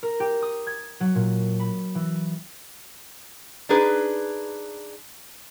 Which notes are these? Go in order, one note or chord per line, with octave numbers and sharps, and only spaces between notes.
A#4
G4
D#6
G#6
F#3
A#2
B5
E3
D4 D#4 G#4 B4